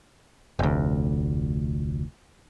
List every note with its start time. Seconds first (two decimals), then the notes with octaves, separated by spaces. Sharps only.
0.59 F1 D2